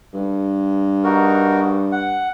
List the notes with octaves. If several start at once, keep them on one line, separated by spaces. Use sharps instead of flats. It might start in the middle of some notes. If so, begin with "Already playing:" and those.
G2
D#4 F#4 A#4
F#5